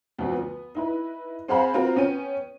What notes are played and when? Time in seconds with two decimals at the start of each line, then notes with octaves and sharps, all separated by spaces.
0.18 D2 F3 B3 F#4
0.33 B3
0.75 D#4 E4 B4
1.48 C4 G#4 C5 F5 F#5 B5
1.74 C4 F4 F#4 A#4
1.96 B3 C#4 G5 D#7